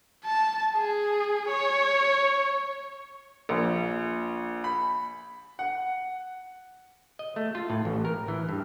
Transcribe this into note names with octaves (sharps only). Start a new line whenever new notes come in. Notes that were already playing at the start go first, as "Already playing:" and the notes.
A5
G#4
C#5
A#1
B5
F#5
D#5
A3
F4
A2
A1
A#4
E3
G2